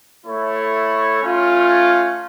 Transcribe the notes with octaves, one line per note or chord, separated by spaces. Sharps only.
A3 E4 A4 C#5
A3 C#4 F4